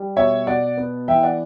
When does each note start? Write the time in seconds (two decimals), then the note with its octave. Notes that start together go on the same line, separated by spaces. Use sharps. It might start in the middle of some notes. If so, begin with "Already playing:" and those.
Already playing: G3
0.17 B2 C#5 E5
0.47 B2 D5 F#5
0.77 B3
1.08 E3 E5 G5
1.23 D5 F#5